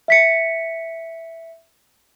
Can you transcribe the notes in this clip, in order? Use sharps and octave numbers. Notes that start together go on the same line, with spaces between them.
E5 B6 C#7